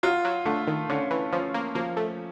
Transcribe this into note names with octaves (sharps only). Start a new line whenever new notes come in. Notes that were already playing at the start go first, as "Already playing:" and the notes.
F#3 F4
F#3
D3 A3
D#3
D3 C#4
E3
F3 C#4
A#3
F3 A#3
A3